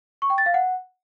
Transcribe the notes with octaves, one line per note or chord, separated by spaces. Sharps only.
C#6
G5
A6
F5
F#5